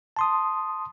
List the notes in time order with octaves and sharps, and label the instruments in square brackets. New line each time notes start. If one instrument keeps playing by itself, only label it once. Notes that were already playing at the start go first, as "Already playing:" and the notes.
[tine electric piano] A5 C6 D#6